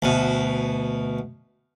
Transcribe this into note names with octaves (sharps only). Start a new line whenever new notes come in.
D2 B2